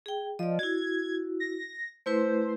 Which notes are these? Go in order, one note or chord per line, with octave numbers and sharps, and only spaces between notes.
G#4 G5
F3 D5 D#5
E4 F#4 G#6
A#6
A3 E4 B4 C5